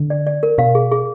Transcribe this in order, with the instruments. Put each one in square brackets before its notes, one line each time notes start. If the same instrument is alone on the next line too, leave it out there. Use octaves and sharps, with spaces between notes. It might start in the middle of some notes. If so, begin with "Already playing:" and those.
Already playing: [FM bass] D3
[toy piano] D5
D5
A#4
[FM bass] B2 [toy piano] F5
[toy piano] G#4
G#4